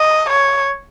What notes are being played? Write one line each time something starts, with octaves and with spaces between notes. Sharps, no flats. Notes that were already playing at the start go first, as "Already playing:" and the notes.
Already playing: D#5
C#5